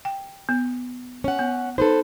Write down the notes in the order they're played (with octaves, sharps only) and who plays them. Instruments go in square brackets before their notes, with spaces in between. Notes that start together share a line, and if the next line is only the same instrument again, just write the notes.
[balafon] G5
B3
[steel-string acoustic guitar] C#4 F#5
[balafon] B3
[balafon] D#4 [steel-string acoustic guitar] A4 B4 C5